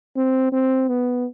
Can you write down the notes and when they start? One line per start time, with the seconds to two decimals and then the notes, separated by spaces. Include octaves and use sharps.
0.16 C4
0.52 C4
0.88 B3